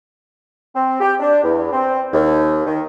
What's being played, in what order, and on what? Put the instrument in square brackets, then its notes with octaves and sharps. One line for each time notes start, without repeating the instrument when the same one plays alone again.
[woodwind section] C4
G4
D4
E2
C4
D#2
D#3